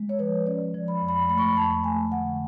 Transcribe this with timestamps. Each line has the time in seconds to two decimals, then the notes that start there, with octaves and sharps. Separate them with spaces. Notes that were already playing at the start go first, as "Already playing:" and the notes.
Already playing: G#3
0.09 C#5
0.19 F3 B4
0.46 C#4 D5
0.74 F3
0.88 B5
1.01 F2
1.09 B5
1.29 A3 B5
1.38 C#6
1.48 B5
1.56 F2 A5
1.83 A3 G#5
2.11 D3 F#5